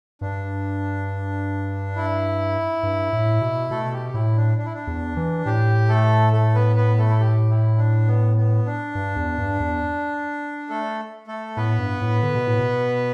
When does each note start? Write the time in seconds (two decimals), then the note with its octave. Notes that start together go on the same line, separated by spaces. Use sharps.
0.21 G2 D4
1.96 E4
2.83 G2
3.13 A2
3.41 B2
3.70 B2 A3 A4
3.93 G4
4.14 A2 E4
4.37 D4
4.58 D4
4.66 E4
4.73 D4
4.87 E2
5.16 E3
5.46 A2 G4
5.89 A3 A4
6.32 A3 A4
6.55 B3 B4
6.76 B3 B4
6.98 A3 A4
7.10 E4
7.20 G4
7.49 E4
7.78 D4
8.07 B3
8.36 B3
8.66 D4
8.95 G2
9.16 E2
9.38 G2
9.60 E2
10.70 A3 A4
11.27 A3 A4
11.57 A2 B3 B4
11.79 G2
12.01 A2
12.22 D3
12.35 B2
12.47 A2
12.60 B2